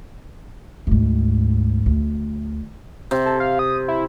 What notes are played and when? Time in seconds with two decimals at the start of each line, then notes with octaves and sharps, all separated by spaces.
0.87 D2 G#2
1.86 D2
3.11 C3
3.26 A4
3.40 F5
3.59 D#6
3.88 E4